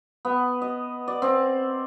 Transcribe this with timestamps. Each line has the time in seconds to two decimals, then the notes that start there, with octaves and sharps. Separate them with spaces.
0.25 B3
0.62 D#5
1.08 D5
1.22 C4